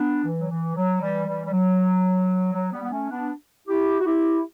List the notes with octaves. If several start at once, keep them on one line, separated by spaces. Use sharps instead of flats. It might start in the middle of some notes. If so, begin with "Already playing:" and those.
Already playing: B3 D4
E3
F#3
E3
F#3
E3 G3
E3 G3
G3
F#3
F#3
G3 B3
B3
A3 C#4
B3 D4
E4 G4
F#4
E4 G4